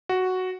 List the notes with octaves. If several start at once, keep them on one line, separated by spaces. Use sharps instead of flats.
F#4